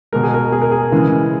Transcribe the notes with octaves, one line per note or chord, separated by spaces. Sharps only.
B2 G#3 A#4
G#4
A#4
G#4
A#4
G#4
C#3 E3 G#3